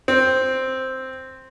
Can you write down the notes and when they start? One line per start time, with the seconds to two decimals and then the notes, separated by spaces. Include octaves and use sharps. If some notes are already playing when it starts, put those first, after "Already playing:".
0.08 C4